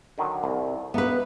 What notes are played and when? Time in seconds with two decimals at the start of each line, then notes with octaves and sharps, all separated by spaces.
0.18 D3 D#3 F#3
0.44 C2
0.94 A#3 B3 D#4 B4 E5